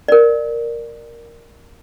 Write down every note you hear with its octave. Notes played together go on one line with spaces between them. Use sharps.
A#4 D5